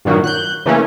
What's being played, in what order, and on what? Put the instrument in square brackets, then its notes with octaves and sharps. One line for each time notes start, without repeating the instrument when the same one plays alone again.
[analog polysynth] G2 A#2 D#3 F#3 A#3 F#4
F#6 G6
C#3 E3 A3 A#3 C#4